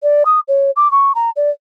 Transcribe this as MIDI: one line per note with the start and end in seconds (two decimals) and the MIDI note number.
0.03 0.23 74
0.25 0.40 87
0.48 0.71 73
0.76 0.91 86
0.91 1.12 85
1.15 1.30 82
1.36 1.50 74